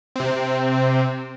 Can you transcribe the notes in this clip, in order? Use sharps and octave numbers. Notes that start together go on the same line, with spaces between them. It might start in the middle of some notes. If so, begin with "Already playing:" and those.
C3 C4